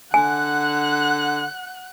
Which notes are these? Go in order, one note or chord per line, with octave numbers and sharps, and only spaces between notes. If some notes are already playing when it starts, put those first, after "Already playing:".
D3 F#5 G#5 F#6